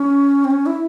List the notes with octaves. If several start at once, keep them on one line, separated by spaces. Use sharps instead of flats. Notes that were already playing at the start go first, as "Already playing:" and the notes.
Already playing: C#4
C4
C#4
E4